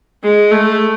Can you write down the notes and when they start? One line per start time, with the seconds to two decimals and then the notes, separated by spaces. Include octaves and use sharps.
0.23 G#3
0.51 A3